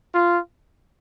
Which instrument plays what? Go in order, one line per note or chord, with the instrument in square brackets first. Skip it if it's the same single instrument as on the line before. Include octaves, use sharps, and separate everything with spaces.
[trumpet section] F4